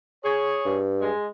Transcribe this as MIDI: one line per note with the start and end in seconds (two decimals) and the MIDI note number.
0.24 0.78 68
0.24 0.78 73
0.65 1.10 43
1.01 1.27 56